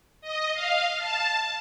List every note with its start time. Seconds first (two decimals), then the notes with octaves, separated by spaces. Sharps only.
0.21 D#5
0.53 F5
0.98 A5